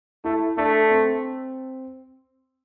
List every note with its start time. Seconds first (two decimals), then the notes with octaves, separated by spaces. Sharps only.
0.24 A3 E4
0.57 A3 D4
0.91 C4